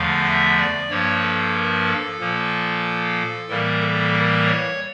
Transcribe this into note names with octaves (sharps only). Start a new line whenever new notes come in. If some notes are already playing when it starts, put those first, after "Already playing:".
Already playing: E2 D3 F3 A3 F5
E5
D5
G2 F3 A#3 C#5
A4
A#4
A4
A#2 F3 A#3
A2 E3 G3 A#3 A#4
A4
A#4
C#5